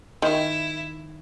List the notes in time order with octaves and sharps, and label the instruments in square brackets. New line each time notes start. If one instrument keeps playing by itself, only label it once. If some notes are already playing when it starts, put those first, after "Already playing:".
[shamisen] D#3 [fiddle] E4